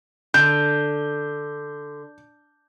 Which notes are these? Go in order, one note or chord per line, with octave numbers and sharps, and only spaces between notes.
D3 G6